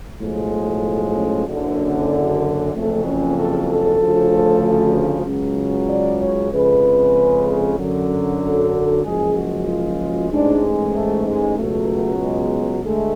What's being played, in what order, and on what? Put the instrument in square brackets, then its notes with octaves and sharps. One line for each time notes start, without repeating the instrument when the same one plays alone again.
[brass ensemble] B1 A2 F3 G#3
A3
C#4
F#1 F#2 D3
F#1 F2 C#3 A3
C#4
A4
A4
D2 C#3 F3
C#2 C#3 F#3
D5
C#5
F2 C#3 G#3 B4
F#2 D3 F#3
A4
F#1 F#2 F3 G#3 G#4
F#4
F4
A1 G#2 G#3 D4
A3
G#3
C#2 B2 F#3 A3
G#3
D2 D3 G#3 A3